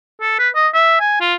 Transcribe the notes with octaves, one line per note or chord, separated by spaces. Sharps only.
A4
B4
D#5
E5
G#5
F4